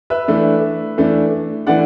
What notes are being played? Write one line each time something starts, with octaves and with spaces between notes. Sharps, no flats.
B4 E5
E3 A3 D4
E3 A3 D4
E3 A3 D4 D5 F#5